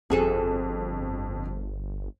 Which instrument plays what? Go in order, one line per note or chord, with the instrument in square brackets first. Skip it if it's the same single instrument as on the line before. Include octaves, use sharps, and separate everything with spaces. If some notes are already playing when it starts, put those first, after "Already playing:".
[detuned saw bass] G1 [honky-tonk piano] F2 [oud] F#4 G#4 A4